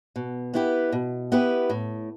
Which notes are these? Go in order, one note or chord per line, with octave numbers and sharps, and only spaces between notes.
B2
B3 E4 G4 B4
B2
B3 E4 G4 B4
A2